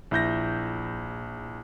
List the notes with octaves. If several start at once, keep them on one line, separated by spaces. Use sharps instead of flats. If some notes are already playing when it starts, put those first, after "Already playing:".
A#1 E4 G6 A#6